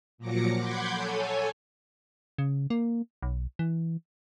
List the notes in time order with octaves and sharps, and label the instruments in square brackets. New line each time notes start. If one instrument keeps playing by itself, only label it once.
[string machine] A#2 F3 F#3 D6 A#6 C#7
F#5 B5 C6 D6 G6 G#6
A4 C#5 G#5
[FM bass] C#3
A#3
B1
E3